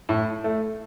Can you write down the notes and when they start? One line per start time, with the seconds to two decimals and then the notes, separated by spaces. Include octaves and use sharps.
0.09 A2
0.44 A3